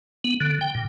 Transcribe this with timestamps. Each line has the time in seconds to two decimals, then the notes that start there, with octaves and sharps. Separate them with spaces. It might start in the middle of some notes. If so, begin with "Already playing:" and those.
0.24 B3
0.40 D3
0.61 G5
0.75 A#2